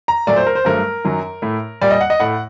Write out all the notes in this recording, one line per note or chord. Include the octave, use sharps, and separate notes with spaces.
A#5
A#2 F#3 A3 D5
C5
A#4
C5
G2 F#3 A3 A#4
F#2 D#3 F#3
A2 A3
A#2 G3 A#3 D5
D#5
F#5
D#5
A2 A3 F#5